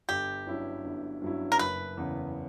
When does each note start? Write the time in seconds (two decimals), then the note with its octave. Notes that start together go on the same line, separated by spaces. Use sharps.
0.09 G1 G4
0.47 G2 F#3 C#4 E4
0.84 G1
1.22 G2 F#3 C#4 E4
1.52 A#4
1.59 F#1 B4
1.97 E2 C#3